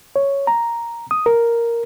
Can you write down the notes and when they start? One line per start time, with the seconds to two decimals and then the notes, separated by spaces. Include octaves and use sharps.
0.16 C#5
0.47 A#5
1.11 D#6
1.26 A#4